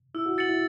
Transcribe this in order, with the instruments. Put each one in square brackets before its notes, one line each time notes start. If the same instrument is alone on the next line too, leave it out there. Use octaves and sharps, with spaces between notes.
[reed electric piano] E4 [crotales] E6
[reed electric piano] F#4
[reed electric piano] F#4 [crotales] A6 C#7 F#7
[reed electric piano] E4